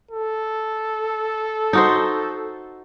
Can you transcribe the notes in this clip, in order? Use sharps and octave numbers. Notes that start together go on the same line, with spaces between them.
A4
D#4 F#4 C5